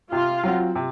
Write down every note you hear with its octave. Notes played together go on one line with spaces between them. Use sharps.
C3 F4
F#3 C4 F#4
C3